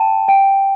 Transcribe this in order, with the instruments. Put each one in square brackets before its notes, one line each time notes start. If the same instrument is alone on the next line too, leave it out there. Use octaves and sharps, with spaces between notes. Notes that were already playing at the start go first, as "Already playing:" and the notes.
Already playing: [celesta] G5 A5
G5